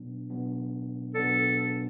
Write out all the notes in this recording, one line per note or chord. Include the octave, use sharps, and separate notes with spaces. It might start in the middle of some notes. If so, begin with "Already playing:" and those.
Already playing: B2 F#3 B3 D4
B2 F#3 B3 D4
B2 F#3 B3 D4 A4